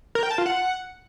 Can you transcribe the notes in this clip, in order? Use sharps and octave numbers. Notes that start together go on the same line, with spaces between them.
A#4
G5
A5
F4
F#5